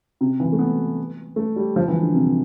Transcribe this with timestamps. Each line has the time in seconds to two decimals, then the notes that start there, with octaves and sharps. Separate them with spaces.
0.21 C3
0.40 E3
0.52 A3
0.59 B3
1.36 A3
1.56 G3
1.76 F3
1.88 E3
2.01 D3
2.14 C3